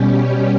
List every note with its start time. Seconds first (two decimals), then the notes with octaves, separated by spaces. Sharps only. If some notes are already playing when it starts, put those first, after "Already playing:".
Already playing: B2 G3 C#4 G4